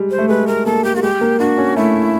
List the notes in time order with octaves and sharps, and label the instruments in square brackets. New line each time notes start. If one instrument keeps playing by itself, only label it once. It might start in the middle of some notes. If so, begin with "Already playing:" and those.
Already playing: [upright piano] G3 G#3
[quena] C5
[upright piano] A3
[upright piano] G#3 [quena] B4
[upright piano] A3 [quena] A#4
[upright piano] A#3 [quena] A4
[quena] G4
[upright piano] G3 [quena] F#4
[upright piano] G#3 [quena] G4
[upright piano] A#3
[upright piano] D4 [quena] F#4
[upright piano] C#4
[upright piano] A3 [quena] E4